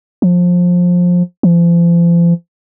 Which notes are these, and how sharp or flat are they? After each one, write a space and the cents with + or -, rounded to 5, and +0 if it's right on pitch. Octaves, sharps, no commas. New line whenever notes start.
F3 +20
F3 -40